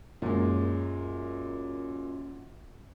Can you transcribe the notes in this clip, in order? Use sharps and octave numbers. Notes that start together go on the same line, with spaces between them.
F#2 A#2 G#3